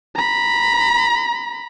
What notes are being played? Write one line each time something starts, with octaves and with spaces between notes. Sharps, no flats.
A#5 B5